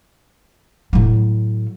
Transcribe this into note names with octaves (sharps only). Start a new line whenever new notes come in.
A2 F#3